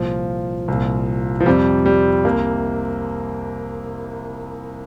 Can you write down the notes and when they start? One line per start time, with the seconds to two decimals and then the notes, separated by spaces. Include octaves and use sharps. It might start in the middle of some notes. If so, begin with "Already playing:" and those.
Already playing: C2 A#2 F3
0.68 C2 A#2
1.40 F3
1.46 F2 C3 G3
1.86 G3
2.25 C2 C3 A#3